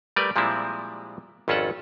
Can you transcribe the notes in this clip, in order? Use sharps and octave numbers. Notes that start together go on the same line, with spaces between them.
G3 A3 A#4 B4 D5
A#2 F3 G3 G#3 C4 E4
G#1 F2 C#4 F4 A4 F#5